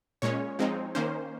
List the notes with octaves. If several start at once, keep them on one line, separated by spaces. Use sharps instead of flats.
A#2 G#3 C#4 C#5
F3 G#3 C4 D#4
D#3 A#3 C#4 C5